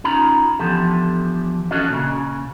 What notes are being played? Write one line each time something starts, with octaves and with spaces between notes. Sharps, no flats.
C#4 D#4 F4 A#5 B5
E2 D3 F3 G4 A4
C#4 D4 F#4 A4 D#5
A#2 C#3